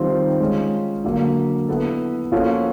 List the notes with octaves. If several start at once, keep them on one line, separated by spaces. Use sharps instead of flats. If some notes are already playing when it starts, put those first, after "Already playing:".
Already playing: D#3 G3 C4 F4
G#3 C#4 F4
D3 F#3 A#3
B3 E4 A4
F3 A#3 C#4 F#4 A4